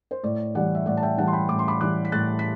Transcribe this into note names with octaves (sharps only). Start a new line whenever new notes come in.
C5
A2 D5
E3 G3 D5 F#5
E5
A2 D5 F#5
A5
E5 G5
E3 G3 F#5 A5
C6
G5 B5
A2 D6
C6
B5 D6
E3 G3 D6 F#6
B6
A2 F#6 A6
B6